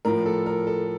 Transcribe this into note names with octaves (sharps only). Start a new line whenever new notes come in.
A2 F3 A#4
A4
A#4
A4